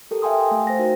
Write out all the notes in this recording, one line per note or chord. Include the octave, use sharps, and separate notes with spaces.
G4 A4 A#4
E5 F5 G5 G#5 C6 D#6
F5
A3
C5 G5 A#6
D#4 F#4 A#4